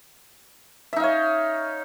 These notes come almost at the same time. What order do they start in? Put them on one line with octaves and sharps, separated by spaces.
E5 D#4 F5 C#5